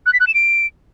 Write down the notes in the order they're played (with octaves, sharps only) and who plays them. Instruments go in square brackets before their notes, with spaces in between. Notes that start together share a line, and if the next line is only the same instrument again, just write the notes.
[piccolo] F#6
B6
F#6
E7
D7